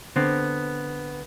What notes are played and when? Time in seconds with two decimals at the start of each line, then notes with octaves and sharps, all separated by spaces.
0.16 D3 B3 C4